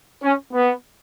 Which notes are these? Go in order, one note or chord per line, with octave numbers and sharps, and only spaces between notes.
C#4
B3